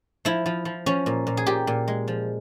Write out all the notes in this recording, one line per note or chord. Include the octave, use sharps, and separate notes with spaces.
F3 E4
F3
F3
F3 C#4
A#2
A#2
G#4
A#2 G4
A#2
G#3
F3